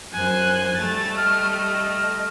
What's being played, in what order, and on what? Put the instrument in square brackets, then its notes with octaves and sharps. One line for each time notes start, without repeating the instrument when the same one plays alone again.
[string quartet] F#2 C5 [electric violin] G#5 F#6
[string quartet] G3 A3 [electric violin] A6
[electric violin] D#5 [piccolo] F6
[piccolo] F6